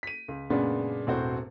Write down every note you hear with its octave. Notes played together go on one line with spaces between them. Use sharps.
B6 D#7
C#2
F#2 A#2 C#3 G#3 B3 D4
E1 A2 C4 F#4 C5